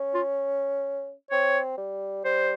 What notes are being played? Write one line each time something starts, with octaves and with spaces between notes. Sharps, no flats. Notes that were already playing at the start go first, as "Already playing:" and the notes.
Already playing: C#4
F4
C4 C#5
G3
G3 C5